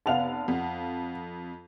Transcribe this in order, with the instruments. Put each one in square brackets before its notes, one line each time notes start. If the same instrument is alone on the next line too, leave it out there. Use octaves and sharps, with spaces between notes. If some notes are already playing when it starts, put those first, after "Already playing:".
[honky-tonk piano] F1 B3 F7 [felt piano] F5 F#5 A5
[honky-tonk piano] F2